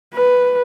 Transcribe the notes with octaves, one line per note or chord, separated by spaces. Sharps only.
B4